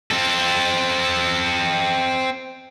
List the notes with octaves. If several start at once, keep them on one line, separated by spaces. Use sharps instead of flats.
C4 A4